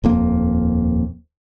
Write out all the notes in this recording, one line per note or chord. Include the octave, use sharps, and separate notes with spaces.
D#1 F2 A#3